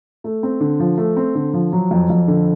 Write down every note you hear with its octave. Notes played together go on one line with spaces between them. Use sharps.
A3
C4
D3
F3
A3
C4
D3
F3
F#3
F2
F2
D3